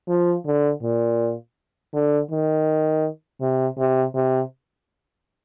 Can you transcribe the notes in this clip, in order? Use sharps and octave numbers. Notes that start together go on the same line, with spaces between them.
F3
D3
A#2
D3
D#3
C3
C3
C3